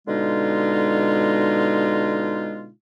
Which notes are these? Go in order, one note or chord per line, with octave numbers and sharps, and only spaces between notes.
B2 D3 G#3 D#4 F4